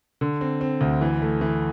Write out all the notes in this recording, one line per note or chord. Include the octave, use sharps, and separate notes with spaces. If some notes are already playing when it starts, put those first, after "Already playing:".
D3
C4
C4
D2
E3
A3
E3